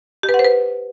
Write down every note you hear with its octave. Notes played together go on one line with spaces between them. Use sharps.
G4
B4
F#5
C5
B4